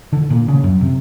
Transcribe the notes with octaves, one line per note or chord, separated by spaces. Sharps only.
D3
A#2
C#3
F#2
C3